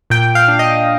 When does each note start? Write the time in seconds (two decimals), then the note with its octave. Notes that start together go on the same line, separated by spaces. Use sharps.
0.10 A#2 G5
0.35 F5
0.48 D4
0.59 D#5